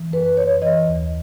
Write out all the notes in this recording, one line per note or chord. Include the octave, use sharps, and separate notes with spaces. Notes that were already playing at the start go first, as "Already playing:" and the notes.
Already playing: E3
F#2 B4
F#2 C#5
E3 D#5
D#2